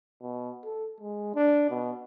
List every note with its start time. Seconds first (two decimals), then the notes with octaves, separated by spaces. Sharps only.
0.21 B2
0.65 A4
1.01 G#3
1.35 D4
1.70 B2